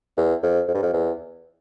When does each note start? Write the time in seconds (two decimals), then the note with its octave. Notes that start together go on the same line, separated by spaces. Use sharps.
0.17 E2
0.43 F2
0.68 F2
0.74 G2
0.82 F2
0.93 E2